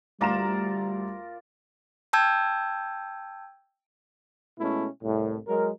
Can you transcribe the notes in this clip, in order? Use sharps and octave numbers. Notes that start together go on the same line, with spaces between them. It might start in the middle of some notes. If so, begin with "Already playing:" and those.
D2 G3 F4 A#4 D5 A#5 E7
G5 A5 E6 G6 G#6
B2 G#3 A3 C#4 E4
C2 A2
F#3 G#3 A#4